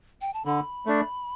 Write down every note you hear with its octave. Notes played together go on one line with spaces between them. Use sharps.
G5
A5
D3 B5
A3 D4